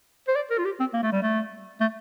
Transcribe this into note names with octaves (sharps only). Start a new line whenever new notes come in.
C5
D5
A#4
F4
G4
C4
A#3
A3
G3
A3
A3